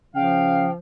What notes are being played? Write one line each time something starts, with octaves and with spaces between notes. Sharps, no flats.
C#3 F3 F5 G5